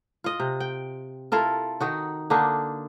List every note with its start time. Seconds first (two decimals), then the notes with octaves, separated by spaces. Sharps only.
0.24 F4 D#5
0.40 C3
0.60 G5
1.32 E4 F4 A4 A#4
1.80 D#3 D#4 F#4
2.30 D3 A#3 D4 D#4